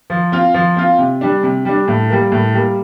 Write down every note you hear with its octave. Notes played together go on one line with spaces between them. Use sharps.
F3
C4 F4
F3
C4 F4
C3
G3 D4
C3
G3 D4
A2
G3 A#3
A2
G3 A#3